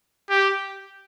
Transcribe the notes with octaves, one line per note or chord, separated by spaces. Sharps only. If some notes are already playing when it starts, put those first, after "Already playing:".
G4